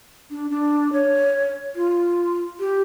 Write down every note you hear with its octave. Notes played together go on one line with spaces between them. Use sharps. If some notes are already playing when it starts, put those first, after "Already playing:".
D4
D4
C#5
F4
G4